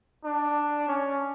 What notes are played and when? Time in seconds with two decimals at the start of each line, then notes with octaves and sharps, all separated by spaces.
0.24 D4
0.88 C#4